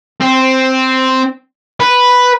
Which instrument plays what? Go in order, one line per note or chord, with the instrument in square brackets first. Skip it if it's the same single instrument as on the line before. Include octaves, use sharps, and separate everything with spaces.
[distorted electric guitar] C4
B4